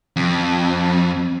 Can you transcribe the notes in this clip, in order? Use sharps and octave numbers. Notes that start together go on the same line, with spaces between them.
F2